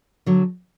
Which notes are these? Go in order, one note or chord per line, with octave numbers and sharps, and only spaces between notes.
D3 F#3